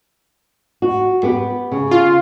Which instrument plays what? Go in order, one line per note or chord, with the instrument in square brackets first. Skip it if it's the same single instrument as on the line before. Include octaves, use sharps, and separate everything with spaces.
[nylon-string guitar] F#4
B3 G4 B4
C#3
[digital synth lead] F4